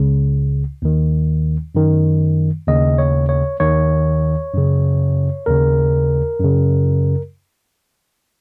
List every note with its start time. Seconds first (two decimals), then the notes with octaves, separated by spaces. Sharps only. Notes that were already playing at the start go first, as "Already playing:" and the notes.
Already playing: C#2 C#3
0.82 D#2 D#3
1.75 F#2 D#3
2.67 D#2 C#3 D#5
2.98 C#5
3.29 C#5
3.60 D#2 D#3 C#5
4.54 F#2 C#3
5.46 D#2 C#3 A#4
6.40 F#2 C#3